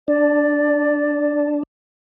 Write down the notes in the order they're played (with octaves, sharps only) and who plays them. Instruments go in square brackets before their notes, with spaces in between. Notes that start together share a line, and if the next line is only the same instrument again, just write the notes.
[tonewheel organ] D4 [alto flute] D5